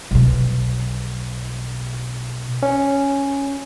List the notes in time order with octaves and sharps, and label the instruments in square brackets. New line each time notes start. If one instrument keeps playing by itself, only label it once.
[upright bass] B1 B2
[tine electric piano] C#4